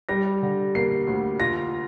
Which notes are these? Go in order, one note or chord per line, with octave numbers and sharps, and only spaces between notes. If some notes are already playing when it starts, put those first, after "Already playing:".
G3 A#6
D3
A#3 C7
D2
F4 A#6